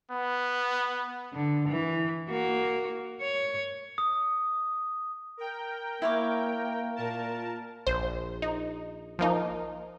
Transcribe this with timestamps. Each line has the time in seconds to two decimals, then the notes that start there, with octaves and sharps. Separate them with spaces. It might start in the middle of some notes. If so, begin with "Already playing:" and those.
0.11 B3
1.34 D3
1.68 E3
2.29 A#3 F#4
3.22 C#5
3.98 D#6
5.37 A#4 G5
6.02 A#3 E4 C#5 D6
6.96 A#2 A#4 A5
7.87 A#1 C5
8.42 D#4
9.19 F3 A#3 D#4